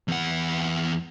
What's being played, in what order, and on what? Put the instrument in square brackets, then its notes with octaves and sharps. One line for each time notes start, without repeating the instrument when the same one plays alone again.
[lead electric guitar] E2 F#5